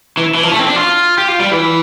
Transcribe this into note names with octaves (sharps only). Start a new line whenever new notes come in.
E3
E3
F3
A3
C4
D4
F4
G4
F4
G3
E3